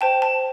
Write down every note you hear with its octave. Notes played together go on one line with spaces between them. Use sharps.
C5 G5 A5
A5